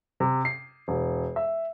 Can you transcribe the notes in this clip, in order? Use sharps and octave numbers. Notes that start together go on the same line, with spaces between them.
C3
C7
E1
E5